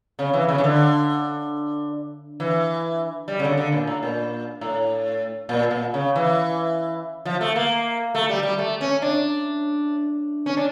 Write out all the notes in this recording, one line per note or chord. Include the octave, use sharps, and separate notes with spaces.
C#3
E3
C#3
E3
D3
E3
G3
C#3
D3
D3
A#2
A2
A#2
A2
A#2
A#2
C#3
E3
F3
A3
A#3
A3
G3
G3
A3
C#4
D4
C#4
D4